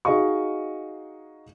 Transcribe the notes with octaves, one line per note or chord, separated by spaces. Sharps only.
D#4 F#4 G#4 D#5 F5 C#6